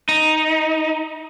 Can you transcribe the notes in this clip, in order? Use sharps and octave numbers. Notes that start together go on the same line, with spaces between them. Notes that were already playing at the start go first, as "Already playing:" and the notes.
D#4